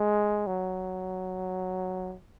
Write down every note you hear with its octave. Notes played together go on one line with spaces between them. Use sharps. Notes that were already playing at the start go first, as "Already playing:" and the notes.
Already playing: G#3
F#3